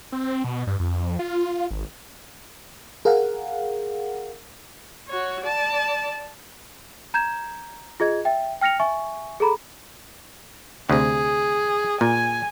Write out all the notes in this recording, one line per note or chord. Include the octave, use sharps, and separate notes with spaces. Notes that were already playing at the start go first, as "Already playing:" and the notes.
C4
B2
G2
F2
F4
G#1
G#4 A#4 F5 F#5
F#4 C#5
D5 A5
A#5 G6 G#6 E7
F4 G#4 D#5 G#6
E5 G5
G5 F6 A#6 C#7 F7
E5 G#5 C#6
G#4 A4 A#5 B5
D2 C3 G#4
A#2 G#5